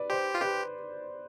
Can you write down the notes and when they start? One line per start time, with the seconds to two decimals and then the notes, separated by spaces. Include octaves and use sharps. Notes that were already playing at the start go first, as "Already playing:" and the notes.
Already playing: B4 D5
0.10 G4 C5
0.35 F4
0.41 G4 B4